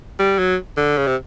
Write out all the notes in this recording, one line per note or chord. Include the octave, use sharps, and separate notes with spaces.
G3
F#3
D3
C#3
C3